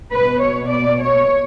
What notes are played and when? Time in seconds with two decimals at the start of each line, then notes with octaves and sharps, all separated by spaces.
0.13 B2 B4
0.42 C#5
0.71 D5
1.00 C#5